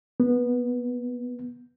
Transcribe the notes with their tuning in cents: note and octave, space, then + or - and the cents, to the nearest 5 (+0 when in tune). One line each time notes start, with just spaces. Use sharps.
B3 -15